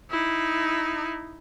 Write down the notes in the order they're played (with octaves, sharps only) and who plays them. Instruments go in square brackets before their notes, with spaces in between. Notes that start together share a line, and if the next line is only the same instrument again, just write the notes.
[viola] D#4 E4